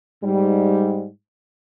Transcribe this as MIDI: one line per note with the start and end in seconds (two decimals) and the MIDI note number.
0.23 1.07 44
0.23 1.07 55